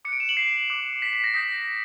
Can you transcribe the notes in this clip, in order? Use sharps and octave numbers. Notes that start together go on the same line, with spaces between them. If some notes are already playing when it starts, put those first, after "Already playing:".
D6 F#6 C#7 D7
E7
F#7
C7
D6 F#6
B6
B6
A#6
D#6 G6 B6